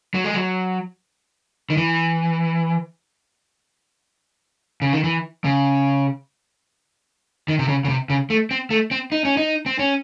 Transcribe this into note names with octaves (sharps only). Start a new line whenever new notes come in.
F#3
G#3
F#3
D#3
E3
C#3
D#3
E3
C#3
D#3
C3
C#3
C#3
C3
C#3
A3
C4
A3
C4
D#4
C#4
D#4
C4
C#4